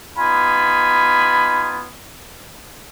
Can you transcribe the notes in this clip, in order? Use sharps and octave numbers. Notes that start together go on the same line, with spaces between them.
B3 D#4 F4 G#5 B5